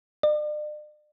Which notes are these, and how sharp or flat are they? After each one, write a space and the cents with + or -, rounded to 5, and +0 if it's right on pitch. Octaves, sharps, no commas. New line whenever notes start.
D5 +40